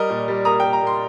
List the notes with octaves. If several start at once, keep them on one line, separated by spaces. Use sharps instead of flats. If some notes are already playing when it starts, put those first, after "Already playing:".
Already playing: G3 A#4 D#5
A#2
G3
A#3 A#5 D#6
A#3 G5
A#5
A#3
C6